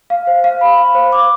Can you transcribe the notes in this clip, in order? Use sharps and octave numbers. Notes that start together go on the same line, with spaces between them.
F5
C5
F5
B5
F5
C5
D6